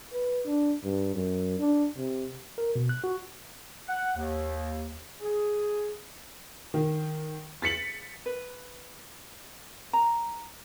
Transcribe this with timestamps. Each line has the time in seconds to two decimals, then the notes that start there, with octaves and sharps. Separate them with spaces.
0.13 B4
0.45 D4
0.84 G2
1.14 F#2
1.59 D4
1.97 C3
2.58 A#4
2.75 B2
2.89 F#6
3.04 F#4
3.88 F#5
4.16 D#2
5.21 G#4
6.74 D#3
7.62 A6 B6 C#7 F#7
8.26 B4
9.93 A#5